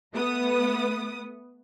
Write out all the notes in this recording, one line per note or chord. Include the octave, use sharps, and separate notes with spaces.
A3 B3 B4 D#6